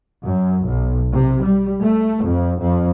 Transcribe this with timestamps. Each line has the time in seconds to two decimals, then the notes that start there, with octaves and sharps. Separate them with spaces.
0.24 F#2
0.66 B1
1.12 C3
1.44 G3
1.81 A3
2.24 F2
2.60 F2